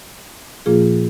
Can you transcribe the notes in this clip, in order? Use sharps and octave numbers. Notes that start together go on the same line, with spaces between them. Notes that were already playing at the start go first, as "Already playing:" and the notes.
A#2 F3 A#3 F4 G#4